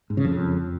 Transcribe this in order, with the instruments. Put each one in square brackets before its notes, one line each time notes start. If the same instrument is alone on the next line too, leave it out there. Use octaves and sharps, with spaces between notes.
[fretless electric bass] G#2
C#3
F2